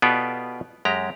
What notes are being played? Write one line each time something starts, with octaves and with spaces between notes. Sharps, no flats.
B2 B3 F4 G4 A4 D5
F#2 G#3 G4 A#5